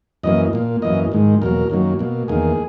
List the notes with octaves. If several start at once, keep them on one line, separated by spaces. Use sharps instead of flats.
F#2 E3 A#3 D#5
A#2 A#3
F#2 E3 A#3 D#5
G#2 D#3 G#3
E2 B2 F#3 A#3 A#4
F#2 D#3 F#3 A#3
B2 A#3
E2 D#3 A#3 G#4